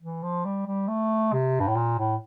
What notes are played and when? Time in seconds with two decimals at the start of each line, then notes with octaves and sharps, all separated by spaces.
0.02 E3
0.23 F3
0.45 G3
0.66 G3
0.88 A3
1.33 C3
1.60 G2
1.68 A2
1.76 A#2
1.98 A2